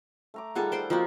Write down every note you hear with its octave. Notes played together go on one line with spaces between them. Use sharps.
A3 A#5 D6
D#3 G3 F4 G#4 A4 F#5
C5 G5 C6
F3 A#3 C4 D#4 F#4